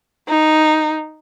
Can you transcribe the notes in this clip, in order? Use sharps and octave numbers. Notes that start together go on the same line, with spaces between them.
D#4